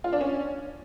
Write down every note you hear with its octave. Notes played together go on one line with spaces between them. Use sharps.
F4
D4
C#4